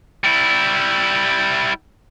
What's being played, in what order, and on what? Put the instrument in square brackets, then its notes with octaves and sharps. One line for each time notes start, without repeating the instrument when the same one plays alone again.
[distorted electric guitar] G3 E4